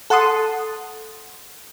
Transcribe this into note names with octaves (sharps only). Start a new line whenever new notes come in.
A4 F#5 A5 C6 D#6